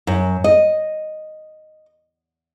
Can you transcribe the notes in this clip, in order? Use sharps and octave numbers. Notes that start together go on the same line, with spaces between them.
F#2
D#5